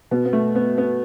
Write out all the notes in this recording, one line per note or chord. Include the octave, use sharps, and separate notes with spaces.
B2 B3
B3
A3
B3
B3